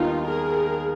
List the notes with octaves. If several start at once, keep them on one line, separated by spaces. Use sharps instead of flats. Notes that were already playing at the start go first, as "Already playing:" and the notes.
Already playing: D#2 D#3 G3 B3 D#4 F4
G#4 A#4